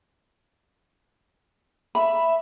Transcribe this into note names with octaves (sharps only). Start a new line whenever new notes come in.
E5 B5